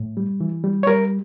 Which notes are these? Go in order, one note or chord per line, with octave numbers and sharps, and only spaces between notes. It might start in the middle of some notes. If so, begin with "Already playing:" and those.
Already playing: A2
G3
E3
G3
C#5
G3 A#4